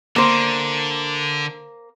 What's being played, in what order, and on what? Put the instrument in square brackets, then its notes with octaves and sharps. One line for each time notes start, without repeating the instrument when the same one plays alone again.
[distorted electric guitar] D3 [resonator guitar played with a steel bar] A#3 C5